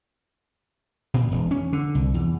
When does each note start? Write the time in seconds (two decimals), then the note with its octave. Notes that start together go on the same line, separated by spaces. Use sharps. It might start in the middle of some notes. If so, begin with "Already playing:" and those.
1.14 A#2
1.31 E1
1.51 C#4
1.73 D3
1.95 C2
2.14 E2